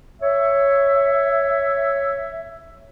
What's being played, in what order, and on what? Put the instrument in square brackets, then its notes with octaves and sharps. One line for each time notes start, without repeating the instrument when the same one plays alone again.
[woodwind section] C#5 E5